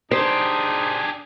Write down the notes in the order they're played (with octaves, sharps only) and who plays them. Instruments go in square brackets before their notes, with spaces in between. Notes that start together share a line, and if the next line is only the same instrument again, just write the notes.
[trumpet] D4 [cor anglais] D#4 [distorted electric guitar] G4 G#4 [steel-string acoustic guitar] C5